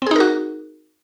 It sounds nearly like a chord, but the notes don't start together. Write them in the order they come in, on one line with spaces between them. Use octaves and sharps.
C4 G#4 D#4 A#4 F#4